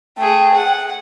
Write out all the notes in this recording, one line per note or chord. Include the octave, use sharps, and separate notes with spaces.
A3 G#4 G5
F#5